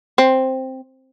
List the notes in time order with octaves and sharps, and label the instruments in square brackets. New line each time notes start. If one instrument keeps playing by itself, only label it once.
[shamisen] C4